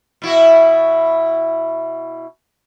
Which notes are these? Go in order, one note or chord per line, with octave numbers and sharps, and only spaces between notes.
B2 E4 F#4